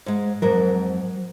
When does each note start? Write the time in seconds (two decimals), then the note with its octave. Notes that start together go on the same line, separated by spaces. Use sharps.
0.06 G#2 G#3
0.42 F2 G#2 F#3 A#4